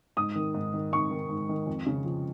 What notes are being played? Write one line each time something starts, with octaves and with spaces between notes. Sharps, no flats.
G#2 D#6
D#3
G#2
D#3
G#2 C#6
D#3
G#2
D#3
F2
C#3
F3